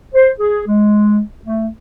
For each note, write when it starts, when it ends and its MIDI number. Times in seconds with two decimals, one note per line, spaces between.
0.14 0.31 72
0.40 0.61 68
0.68 1.21 56
1.46 1.68 57